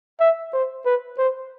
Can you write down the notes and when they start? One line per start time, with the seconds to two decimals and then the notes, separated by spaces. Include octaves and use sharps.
0.20 E5
0.53 C5
0.85 B4
1.18 C5